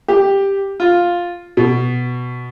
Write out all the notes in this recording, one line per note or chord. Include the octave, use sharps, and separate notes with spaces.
G4
F4
B2